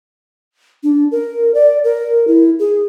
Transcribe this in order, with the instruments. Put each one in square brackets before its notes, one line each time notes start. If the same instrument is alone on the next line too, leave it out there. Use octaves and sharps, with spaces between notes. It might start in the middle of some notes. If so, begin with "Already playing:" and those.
[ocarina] D4
A#4
D5
A#4
E4
G#4